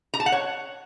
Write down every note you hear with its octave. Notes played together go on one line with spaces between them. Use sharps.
A#5
A5
F#5
C#5